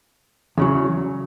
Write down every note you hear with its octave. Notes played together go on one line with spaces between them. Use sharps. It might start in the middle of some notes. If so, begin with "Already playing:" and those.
E2 C#3 F#3